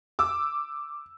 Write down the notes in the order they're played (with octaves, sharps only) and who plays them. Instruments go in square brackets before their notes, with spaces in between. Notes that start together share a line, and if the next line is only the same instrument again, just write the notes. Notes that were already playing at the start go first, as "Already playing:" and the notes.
[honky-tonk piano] D6 E6